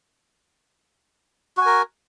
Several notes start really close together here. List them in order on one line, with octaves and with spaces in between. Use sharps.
F#4 G#5 A#4